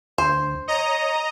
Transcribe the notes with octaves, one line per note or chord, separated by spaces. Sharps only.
D2 C5
C#5 D#5 A#5